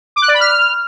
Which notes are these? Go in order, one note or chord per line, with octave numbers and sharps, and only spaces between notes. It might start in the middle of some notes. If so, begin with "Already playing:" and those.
D6
F#6
D5
B5
F6